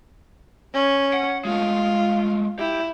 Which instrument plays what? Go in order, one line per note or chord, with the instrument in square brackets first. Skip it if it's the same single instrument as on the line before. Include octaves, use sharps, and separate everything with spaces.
[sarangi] C#4
[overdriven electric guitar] F#5
[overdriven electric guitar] G#3 A3 [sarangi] F4
[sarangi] E4 [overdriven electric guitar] G4